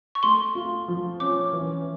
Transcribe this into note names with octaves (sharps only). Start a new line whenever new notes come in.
C#6
A3 C6
F4
F3
C#4 D6
E3